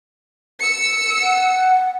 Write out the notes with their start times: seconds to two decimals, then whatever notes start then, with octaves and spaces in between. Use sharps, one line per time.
0.60 E6 C#7
1.22 F#5